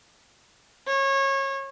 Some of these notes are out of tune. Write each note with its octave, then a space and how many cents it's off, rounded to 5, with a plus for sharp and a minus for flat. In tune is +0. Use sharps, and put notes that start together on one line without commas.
C#5 -25